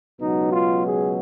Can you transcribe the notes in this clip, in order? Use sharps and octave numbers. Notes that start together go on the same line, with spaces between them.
C#2 B2 F#3 D#4
F4
G#4